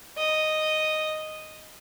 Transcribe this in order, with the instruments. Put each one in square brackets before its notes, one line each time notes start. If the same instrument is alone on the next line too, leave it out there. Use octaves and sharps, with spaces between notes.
[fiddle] D#5